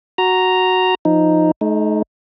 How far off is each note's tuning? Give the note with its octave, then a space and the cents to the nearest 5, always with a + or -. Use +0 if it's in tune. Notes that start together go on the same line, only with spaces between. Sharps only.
F#4 +0 A#5 +0
F3 +0 D#4 +0
A3 -45 D#4 +0